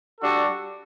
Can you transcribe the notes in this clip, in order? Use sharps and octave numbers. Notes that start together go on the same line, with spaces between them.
G3 D4 F#4 A4